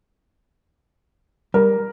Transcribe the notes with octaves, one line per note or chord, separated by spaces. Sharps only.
G3 A#4